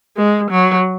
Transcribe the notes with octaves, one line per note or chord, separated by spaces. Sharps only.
G#3
F#3